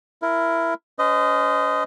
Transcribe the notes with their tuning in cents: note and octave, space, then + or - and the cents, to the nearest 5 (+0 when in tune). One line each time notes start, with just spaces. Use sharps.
E4 +15 A#4 +0
C#4 +25 C5 -40 D#5 +0